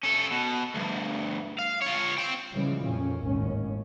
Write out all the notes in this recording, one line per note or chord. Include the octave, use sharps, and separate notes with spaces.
C#4 A4
B2
D2 G2
F5
F4 C#5
C4 G5
C#3 E3 F3 G3 G#3
F2 A#2 C#4
G#1 D#2 A2 C#4